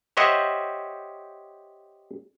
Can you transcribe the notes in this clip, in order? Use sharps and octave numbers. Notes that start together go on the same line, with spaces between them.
G4 C5 C#5 D#5 E5 F#5